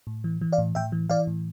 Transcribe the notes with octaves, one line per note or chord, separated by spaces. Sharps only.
A2
E3
E3
D5 F5
A2
A2 E5 G5
E3
E3 D5 F5
A2